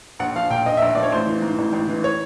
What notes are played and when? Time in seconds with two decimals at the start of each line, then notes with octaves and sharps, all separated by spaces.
0.19 A#1 F#5
0.36 F3 F5
0.50 A#2 G5
0.66 A#1 D#5
0.77 E5
0.82 A#1 D#5
0.95 F3 D5
1.03 C#5
1.12 A1 C5
1.27 E3
1.42 G#2
1.58 A1
1.73 A1
1.88 E3
2.04 C#5